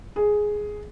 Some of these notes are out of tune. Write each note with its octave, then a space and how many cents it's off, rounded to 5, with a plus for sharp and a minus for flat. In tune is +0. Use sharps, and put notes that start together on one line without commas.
G#4 +5